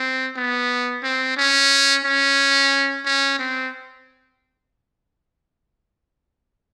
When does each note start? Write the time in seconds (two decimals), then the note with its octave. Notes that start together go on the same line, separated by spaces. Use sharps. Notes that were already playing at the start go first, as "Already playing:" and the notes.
Already playing: C4
0.36 B3
1.03 C4
1.37 C#4
2.05 C#4
3.05 C#4
3.39 C4